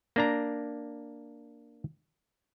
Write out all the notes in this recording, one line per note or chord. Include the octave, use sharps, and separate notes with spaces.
A#3 D4 A#5